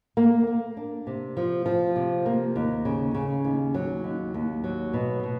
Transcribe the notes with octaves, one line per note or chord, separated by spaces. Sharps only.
A#3
A#3
D4
C3
F3
F3
C3
A#3
D#2
C#3
C#3
D#2
F#3
D#2
D#2
F#3
B2
B2